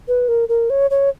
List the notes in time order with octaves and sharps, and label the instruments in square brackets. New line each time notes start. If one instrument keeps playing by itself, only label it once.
[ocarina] B4
A#4
A#4
C#5
C#5